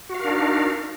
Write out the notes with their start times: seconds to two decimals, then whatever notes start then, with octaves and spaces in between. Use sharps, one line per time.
0.09 F#4
0.14 F5
0.19 A#4
0.24 D4
0.29 D#4